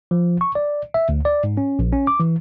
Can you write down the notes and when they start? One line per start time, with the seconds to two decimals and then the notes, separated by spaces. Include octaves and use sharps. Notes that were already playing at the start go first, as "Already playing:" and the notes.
0.11 F3
0.41 C#6
0.55 D5
0.94 E5
1.09 D2
1.25 D5
1.44 G#2
1.57 C#4
1.79 A#1
1.93 C#4
2.07 D6
2.20 E3